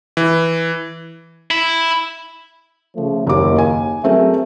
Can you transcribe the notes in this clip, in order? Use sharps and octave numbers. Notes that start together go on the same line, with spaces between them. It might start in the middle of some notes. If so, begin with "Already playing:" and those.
E3
E4
C#3 F3 A3
F#1 D#2 D6
G#5
F#3 A3 C4 G#4 A#4 E5